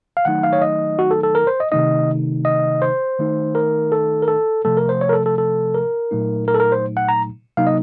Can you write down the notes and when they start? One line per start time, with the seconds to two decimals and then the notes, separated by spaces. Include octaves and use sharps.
0.17 F5
0.25 D#3 F#3 A3 D#4 F#5
0.43 F5
0.53 C#5
0.62 D#5
0.99 F#4
1.11 A4
1.23 A4
1.35 A#4
1.47 C5
1.60 D#5
1.72 C3 D#3 A3 D#4 D#5
2.45 D#5
2.82 C5
3.19 D#3 A3 D#4
3.55 A#4
3.92 A4
4.22 A#4
4.28 A4
4.65 C3 F3 A3 A4
4.77 A#4
4.89 C5
5.01 C#5
5.09 A#4
5.13 A4
5.26 A4
5.38 A4
5.74 A#4
6.11 A#2 F#3 A3 D#4
6.48 A#4
6.54 A4
6.60 A#4
6.72 C5
6.97 F#5
7.09 A#5
7.57 C3 F#3 A#3 D#4 F5
7.67 D#5